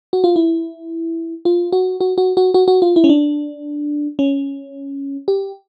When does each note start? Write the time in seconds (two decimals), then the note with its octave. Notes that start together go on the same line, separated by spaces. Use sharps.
0.13 F#4
0.24 F4
0.36 E4
1.45 F4
1.72 F#4
2.01 F#4
2.18 F#4
2.37 F#4
2.54 F#4
2.68 F#4
2.82 F4
2.96 E4
3.04 C#4
3.09 D4
4.19 C#4
5.28 G4